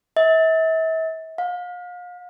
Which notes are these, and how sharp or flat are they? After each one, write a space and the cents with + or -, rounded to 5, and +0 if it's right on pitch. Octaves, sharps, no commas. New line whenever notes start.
E5 -40
F5 +35